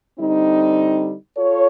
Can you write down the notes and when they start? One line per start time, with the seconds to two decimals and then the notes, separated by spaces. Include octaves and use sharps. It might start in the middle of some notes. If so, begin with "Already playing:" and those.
0.19 D3 G3 C4 D#4
1.36 F4 A4 C#5